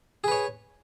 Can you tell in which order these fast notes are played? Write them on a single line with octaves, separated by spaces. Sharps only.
G#4 B4 C#5